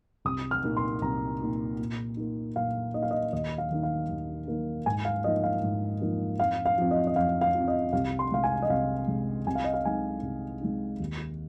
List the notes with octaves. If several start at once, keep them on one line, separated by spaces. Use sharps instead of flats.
C2 D#6
F6
A#2 A#3 D#4
C6
C2 A#5
A#2 A#3 D#4
A#2
A#3 D#4
A#2 F5
A#3 D#4 D#5
F5
D#5
D#2 D#5
F5
D#3 A#3 D#4
F5
D#2
D#3 A#3 D#4
G#2 G#5
F5
F3 A#3 D#4 D#5
F5
G#2
F3 A#3 D#4
F2 F5
F5
F3 C4
D#5
D#5
F2 F5
F5
F3 C4
D#5
C2 F5
C6
C3 G#3 F5
G#5
D#5
C2 F5
C3 G#3
C2 G#5
F5
D#5
F5
C3 G#3 D#4 G#5
C2
C3 G#3 D#4
D#2